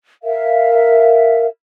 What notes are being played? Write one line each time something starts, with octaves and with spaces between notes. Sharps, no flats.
A#4 E5 F5